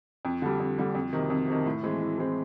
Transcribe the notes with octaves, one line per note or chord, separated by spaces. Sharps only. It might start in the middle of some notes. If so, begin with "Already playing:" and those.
F2
D3 G3
F2
D3 G3
F2
C3 D#3
F2
C3 D#3
A2
E3 G#3 C4
A2
E3 G#3 C4